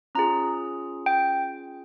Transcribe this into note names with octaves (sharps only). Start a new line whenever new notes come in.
C#4 F4 G#4 A#5
G5